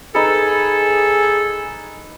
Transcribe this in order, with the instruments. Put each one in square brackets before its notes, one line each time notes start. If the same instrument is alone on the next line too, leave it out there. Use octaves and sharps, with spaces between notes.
[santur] D#4 B4 [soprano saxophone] G#4 [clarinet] A4